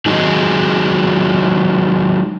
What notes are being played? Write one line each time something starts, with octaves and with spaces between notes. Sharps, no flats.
D#3 F#3 G#3 D#4 G#4